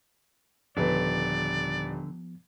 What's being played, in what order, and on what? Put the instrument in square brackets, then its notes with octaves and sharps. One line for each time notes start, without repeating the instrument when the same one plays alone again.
[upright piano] D#1 B4 [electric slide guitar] D3 [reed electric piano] F3 B3 [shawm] D5